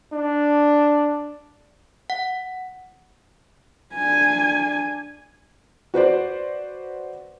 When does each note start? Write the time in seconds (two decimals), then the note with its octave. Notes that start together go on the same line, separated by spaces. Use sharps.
0.12 D4
2.10 F#5
3.95 D4 G#5
5.94 F#4 B4 C5 D5